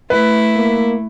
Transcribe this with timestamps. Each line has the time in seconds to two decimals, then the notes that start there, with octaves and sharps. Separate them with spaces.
0.10 A3 E4 B4
0.56 A#3